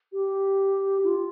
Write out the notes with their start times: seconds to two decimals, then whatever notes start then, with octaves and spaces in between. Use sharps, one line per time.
0.13 G4
1.04 E4
1.07 F4